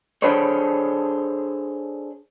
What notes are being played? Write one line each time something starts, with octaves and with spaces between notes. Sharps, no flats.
D4 G#4 A4 C5 C#5